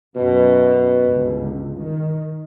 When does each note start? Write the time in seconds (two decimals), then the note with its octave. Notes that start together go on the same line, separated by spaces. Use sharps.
0.16 F#2 B2
1.01 G1 C#2
1.76 D#3